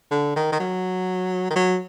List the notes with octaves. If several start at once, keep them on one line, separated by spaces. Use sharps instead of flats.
D3
D#3
D#3
F#3
D#3
F#3